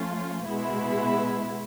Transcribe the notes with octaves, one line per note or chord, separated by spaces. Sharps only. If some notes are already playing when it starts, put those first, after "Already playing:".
Already playing: F3 A3 C#4 F4
B2 G#3 B3 E4